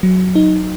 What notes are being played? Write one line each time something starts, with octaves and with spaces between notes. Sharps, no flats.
F#3
D#4